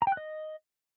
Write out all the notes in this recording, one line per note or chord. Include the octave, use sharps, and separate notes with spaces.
A#5
G5
F#6
D#5